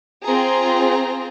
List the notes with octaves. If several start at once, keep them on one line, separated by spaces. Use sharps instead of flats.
C4 F4 G#4 A#5